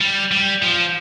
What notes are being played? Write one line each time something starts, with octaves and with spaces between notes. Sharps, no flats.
G3
G3
F3